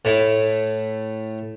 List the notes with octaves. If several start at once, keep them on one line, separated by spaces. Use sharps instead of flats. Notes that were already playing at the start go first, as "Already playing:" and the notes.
A2 A3 E4